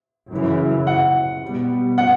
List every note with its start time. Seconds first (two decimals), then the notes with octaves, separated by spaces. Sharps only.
0.31 F#2 C#3 E3
0.87 F#5
1.43 B2 G3 B3
1.98 F#5